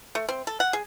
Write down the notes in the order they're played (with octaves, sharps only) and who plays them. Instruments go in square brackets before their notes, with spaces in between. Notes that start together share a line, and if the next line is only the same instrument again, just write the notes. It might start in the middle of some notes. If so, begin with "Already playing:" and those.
[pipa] A3
C4
A4
F#5
G#4